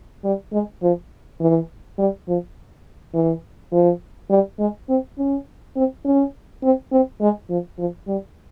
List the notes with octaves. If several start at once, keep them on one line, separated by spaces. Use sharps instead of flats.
G3
G#3
F3
E3
G3
F3
E3
F3
G3
G#3
C4
C#4
C4
C#4
C4
C4
G#3
F3
F3
G3